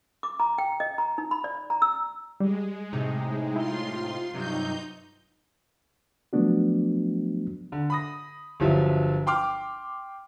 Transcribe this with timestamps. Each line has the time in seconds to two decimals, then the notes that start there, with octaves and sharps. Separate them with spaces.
0.23 D6
0.40 A#5
0.58 G5
0.80 D#5
0.98 A#5
1.18 D#4
1.31 B5
1.44 D5
1.70 A#5
1.82 E6
2.40 G3 G#3
2.93 A2 C3 D#4
3.56 E4 F4 C6
4.33 G2 C3 F#3 D#4 G6
6.33 F3 F#3 A3 B3 D4 F#4
7.72 D3
7.90 B5 D#6 A#6
8.60 G1 F3 F#3 E5
9.27 G5 C6 D6 F6